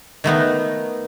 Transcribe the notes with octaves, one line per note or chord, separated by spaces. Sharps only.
D#3 A3 B3 D#4